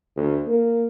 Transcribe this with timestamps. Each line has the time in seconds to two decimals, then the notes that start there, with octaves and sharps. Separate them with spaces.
0.16 D2
0.47 A#3